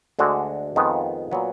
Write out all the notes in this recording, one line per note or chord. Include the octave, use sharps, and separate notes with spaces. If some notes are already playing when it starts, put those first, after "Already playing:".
D2 D3 G#3 D4 F#4
F2 D#3 G#3 B3 F4
A#2 F#3 B3